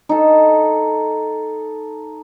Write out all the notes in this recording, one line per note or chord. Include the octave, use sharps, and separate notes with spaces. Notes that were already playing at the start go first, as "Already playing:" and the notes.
D#4 A4